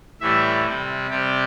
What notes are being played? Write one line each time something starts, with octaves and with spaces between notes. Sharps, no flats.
A2 E3 G3 E5
C3 G3
C3 G3 G4